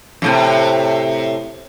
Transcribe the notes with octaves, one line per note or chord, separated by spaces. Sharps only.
F#2 A2 C3